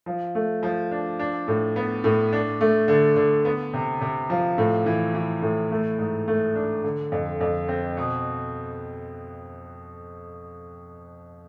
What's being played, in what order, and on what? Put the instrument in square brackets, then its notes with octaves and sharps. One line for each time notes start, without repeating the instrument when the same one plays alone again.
[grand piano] F3
A3
F3
D4
D4
A2
B3
A2
D4
A3
D3
D3
B3
C3
C3
F3
A2
E3
E3
A2
A3
G#2
A3
D4
D3
F2
F2
C4
B2